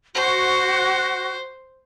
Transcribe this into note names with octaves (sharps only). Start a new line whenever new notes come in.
F#4 C5